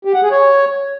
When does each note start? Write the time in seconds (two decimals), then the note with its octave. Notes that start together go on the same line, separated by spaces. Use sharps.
0.05 G4
0.14 F#5
0.23 G#4
0.32 C#5